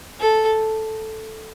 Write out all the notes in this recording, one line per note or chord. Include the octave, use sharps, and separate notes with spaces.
A4